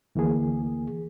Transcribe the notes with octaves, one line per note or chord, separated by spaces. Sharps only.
D2 E3 A#3 G#4